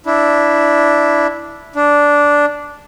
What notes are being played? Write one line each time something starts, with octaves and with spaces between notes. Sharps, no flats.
D4 E4
D4